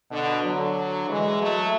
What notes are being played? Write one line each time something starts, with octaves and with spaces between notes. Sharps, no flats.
B2 D3
D3 F#3
E3 G#3
F#3 A3